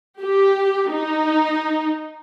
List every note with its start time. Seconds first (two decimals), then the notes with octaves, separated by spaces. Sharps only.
0.22 G4
0.93 D#4